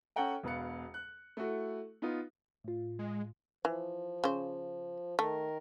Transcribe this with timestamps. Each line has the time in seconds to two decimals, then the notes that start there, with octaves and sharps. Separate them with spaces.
0.16 C#4 A4 F#5 G5 A#5
0.43 E1 B2 B4 F5 C#7
0.94 F#6
1.37 A3 E4 F#4
2.02 B3 D#4 F4
2.64 A2 F4
2.99 G#3
3.65 E3 F3
4.24 C#3 C5
5.19 D#3 A3 A#4